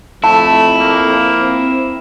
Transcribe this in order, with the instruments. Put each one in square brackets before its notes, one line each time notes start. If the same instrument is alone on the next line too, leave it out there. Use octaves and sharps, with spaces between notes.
[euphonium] F2 [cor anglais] A3 [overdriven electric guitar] E4 [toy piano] A5
[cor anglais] A#3
[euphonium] C4